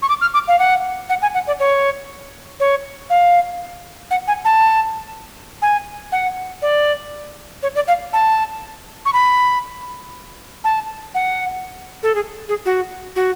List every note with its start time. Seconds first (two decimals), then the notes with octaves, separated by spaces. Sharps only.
0.02 C#6
0.09 D6
0.21 F6
0.34 D6
0.48 F5
0.59 F#5
1.09 F#5
1.22 G#5
1.34 F#5
1.47 D5
1.60 C#5
2.60 C#5
3.10 F5
4.11 F#5
4.27 G#5
4.45 A5
5.62 G#5
6.12 F#5
6.62 D5
7.63 C#5
7.75 D5
7.88 F5
8.13 A5
9.05 C#6
9.13 B5
10.64 A5
11.15 F#5
12.03 A4
12.15 G#4
12.49 G#4
12.65 F#4
13.16 F#4